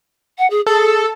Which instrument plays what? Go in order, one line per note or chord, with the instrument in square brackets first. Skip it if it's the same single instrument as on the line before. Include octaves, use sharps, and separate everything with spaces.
[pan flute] F#5
G#4
[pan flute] G#4 [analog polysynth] A4